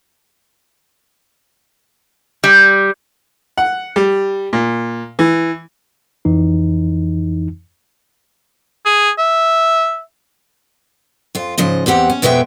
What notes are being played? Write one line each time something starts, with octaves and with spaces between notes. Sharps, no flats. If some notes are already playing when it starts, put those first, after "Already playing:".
G3
F#5
G3
A#2
E3
F2 E3 D#4
G#4
E5
F2 F4
G#2 C#3 F3 D#5
E2 C4 G4 F#5
C#4
F2 B2 G#3 B3 E5 G5